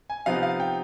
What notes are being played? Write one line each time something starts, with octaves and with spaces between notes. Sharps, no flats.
G#5
C3 F3 B3 D#4 F5
F5
G5